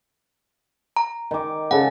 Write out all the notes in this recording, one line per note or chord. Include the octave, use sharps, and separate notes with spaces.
A#5
D#3 D6
C#3 A4 F#5